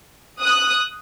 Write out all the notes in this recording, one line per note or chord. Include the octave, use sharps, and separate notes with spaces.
D#6 F#6